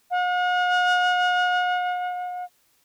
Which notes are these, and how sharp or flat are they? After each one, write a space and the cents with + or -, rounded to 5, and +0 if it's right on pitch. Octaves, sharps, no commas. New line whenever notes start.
F#5 -45